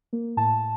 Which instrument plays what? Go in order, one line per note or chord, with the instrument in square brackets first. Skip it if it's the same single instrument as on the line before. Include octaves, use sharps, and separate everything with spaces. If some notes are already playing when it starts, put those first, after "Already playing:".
[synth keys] A#3
A2 A5